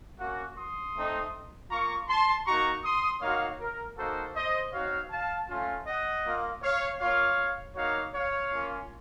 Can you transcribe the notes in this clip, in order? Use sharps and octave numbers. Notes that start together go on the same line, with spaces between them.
A#3 C#4 F#4
C6 D#6
A3 C4 D#4
A#3 F4 A#5 C#6
A5 C6
A#3 D#4 F#4 A#5 C#6
C6 D#6
A#3 D#4 F#4 C#5 F5
A#4
A#3 D#4 F#4 A4 C5
C5 D#5
C4 D#4 F#4 C#5 F5
F5 A5
A3 C#4 F4
D#5 F#5
A#3 F4
C#5 F5
A#3 F4 C#5 F5
A#3 D#4 F#4 C#5 F5
C#5 F5
A#3 C#4 F4